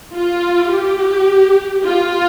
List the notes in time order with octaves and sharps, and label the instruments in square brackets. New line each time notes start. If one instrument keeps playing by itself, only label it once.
[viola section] F4
G4
F4